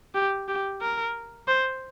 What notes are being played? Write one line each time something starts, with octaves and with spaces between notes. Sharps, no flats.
G4
G4
A#4
C5